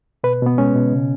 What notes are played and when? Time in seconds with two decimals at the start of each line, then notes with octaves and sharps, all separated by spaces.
0.24 B2 B4
0.42 B2 B3
0.58 G#3 C#4
0.75 B2
0.93 C#3